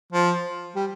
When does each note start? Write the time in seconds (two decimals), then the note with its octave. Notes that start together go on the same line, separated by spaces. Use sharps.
0.13 F3
0.75 G3